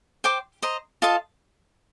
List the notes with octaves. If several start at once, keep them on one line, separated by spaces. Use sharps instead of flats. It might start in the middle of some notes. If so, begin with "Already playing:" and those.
C5 G5 D6
C5 D#5 A#5
F4 A4 D#5 A5